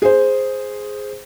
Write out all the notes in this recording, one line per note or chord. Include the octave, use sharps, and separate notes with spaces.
G#4 C5